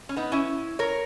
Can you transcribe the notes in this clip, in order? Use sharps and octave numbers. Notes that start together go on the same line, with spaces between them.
C#4
B3 D#4
C#4 E4
A#4 C#5